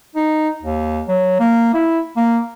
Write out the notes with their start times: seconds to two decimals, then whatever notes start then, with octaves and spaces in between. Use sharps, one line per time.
0.15 D#4
0.62 D#2
1.09 F#3
1.40 A#3
1.74 E4
2.17 A#3